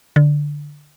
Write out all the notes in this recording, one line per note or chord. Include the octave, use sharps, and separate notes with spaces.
D3